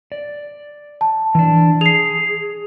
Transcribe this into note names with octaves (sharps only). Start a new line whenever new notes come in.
D5
A5
E3 D4
G#4 C7 F7